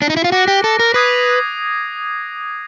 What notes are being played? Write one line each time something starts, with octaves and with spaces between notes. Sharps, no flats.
D4
D#4
E4
F4
F#4 D6 F#6 A#6 D7
G4
A4
A#4
B4 D#6 G#6 C7 D#7